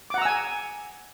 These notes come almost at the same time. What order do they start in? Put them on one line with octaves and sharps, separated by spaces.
D6 F#5 A#5 E6 G#5